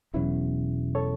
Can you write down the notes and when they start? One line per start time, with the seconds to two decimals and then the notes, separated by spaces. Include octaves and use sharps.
0.14 E1 E2 B2 F#3 C#4 E4
0.95 A4 C#5